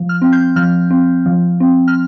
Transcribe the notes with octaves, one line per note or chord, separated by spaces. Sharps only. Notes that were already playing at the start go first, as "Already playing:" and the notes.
Already playing: F3
F6
C4
G6
F3 F6
C4
F3
C4
F6